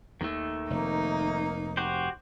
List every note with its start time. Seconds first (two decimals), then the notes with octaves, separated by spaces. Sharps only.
0.21 D#2 D#3 A3
0.70 F1 A#3 D#4
1.77 F#4 G4 C5